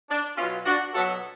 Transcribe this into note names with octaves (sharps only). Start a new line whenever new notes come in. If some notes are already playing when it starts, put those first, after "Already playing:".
D4
B2 F#3 B3 C#4 F4
D4 F#4
B2 F#3 B3 F#4 A4